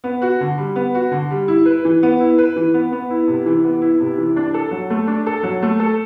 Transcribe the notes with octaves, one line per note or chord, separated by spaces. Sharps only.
B3
F#4
D3
G3
B3
F#4
D3
G3
E4
B4
E3
B3
E4
B4
E3
B3
B3
E4
C3
E3
B3
E4
C3
E3
D4
A4
F#3
A3
D4
A4
F#3
A3
A4